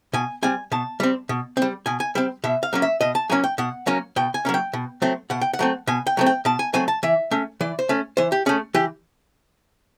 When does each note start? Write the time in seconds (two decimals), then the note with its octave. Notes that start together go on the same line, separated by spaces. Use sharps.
0.13 B2 G#5
0.43 G3 C4 G#5
0.72 B2 A5
1.00 G3 C4
1.29 B2
1.57 G3 C4
1.86 B2 G#5
2.00 G#5
2.15 G3 C4 G5
2.44 B2 E5
2.63 F5
2.73 F#3 A#3 C#4
2.82 E5
3.01 B2 D#5
3.15 A5
3.30 F#3 A#3 C#4 G#5
3.44 G5
3.58 B2 F#5
3.87 F#3 A#3 C#4
4.16 B2 G5
4.34 G#5
4.45 F#3 A#3 C#4
4.54 G5
4.73 B2
5.02 F#3 A3 C4
5.30 B2 F#5
5.41 G5
5.53 F#5
5.59 F#3 A3 C4
5.87 B2 G#5
6.07 G5
6.17 F#3 A3 C4
6.26 G5
6.45 B2 A5
6.59 G#5
6.74 F#3 A3 C4 G#5
6.88 A5
7.03 E3 E5
7.31 A3 C#4
7.61 E3 D5
7.79 C5
7.89 A3 C#4
8.17 E3 C5
8.32 G4
8.46 A3 C#4 G#4
8.74 E3 G4